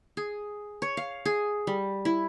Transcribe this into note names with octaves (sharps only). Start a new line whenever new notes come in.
G#4
C#5
F5
G#4
G3
E4